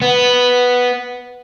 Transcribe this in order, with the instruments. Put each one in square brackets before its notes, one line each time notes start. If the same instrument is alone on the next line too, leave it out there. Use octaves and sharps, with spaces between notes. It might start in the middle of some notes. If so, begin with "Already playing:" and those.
[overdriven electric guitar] B3